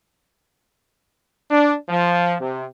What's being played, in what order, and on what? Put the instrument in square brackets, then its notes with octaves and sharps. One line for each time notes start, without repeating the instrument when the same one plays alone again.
[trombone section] D4
F3
C3